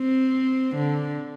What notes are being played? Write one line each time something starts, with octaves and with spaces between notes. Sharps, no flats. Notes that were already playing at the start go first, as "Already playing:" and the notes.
Already playing: C4
D3